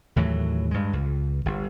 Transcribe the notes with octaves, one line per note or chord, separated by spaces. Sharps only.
D#2 A2 E3 F#3
G2 G#3
C#2
G1